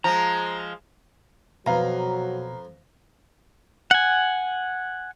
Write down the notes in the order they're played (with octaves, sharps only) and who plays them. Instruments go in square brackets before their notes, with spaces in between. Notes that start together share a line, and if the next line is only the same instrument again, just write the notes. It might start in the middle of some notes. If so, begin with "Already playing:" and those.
[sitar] F3 G#3 [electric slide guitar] A#5
[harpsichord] F2 [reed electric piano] B2 [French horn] F#3 [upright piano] B4 F5 A#5
[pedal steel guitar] F#5 G#5